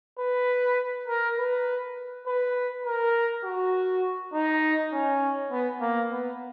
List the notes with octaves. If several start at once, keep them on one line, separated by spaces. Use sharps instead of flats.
B4
A#4
B4
B4
A#4
F#4
D#4
C#4
B3
A#3
B3